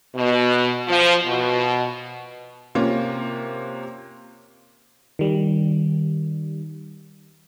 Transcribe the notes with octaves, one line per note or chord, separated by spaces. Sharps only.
B2
F3
B2
C3 A#3 C#4 F4
D#3 G3